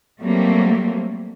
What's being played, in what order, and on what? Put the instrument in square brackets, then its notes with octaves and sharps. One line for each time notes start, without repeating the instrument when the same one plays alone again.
[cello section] F#3 G3 A3 A#3 C4